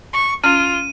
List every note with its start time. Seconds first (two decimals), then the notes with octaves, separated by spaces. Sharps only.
0.13 C#6
0.44 C#4 F4 F6 D#7